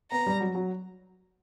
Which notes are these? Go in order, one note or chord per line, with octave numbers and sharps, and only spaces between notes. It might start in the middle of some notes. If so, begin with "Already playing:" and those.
B3 A#5
G3
F#3
F#3